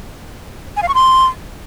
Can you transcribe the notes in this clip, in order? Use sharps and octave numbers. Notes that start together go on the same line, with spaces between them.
G#5
F5
C#6
C6